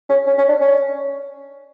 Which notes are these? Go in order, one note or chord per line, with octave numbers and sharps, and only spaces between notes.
C#4
C#4
C#4
D4
C#4